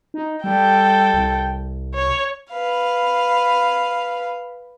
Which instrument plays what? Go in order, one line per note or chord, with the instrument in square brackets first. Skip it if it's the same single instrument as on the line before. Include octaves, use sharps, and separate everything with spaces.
[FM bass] D#4
[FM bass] G3 [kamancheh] A4 G5
[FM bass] C2
[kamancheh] C#5
[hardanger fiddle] B4 F5